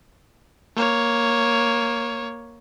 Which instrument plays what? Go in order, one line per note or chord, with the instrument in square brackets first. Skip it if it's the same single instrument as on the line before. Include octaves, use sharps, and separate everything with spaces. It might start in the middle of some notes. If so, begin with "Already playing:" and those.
[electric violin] A#3 C#5